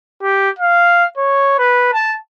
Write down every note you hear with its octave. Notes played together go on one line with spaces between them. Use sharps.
G4
F5
C#5
B4
A5